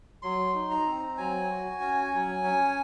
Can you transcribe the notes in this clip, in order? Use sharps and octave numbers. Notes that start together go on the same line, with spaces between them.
F#3 C6
D#4
A#5
C4
F#3 G#5
F#4
C#4
F#3
C#4